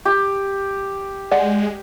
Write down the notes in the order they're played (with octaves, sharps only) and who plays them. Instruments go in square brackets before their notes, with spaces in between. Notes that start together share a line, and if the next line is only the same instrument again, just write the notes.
[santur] G4
[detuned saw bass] G#3 [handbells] D5 F#5 C#7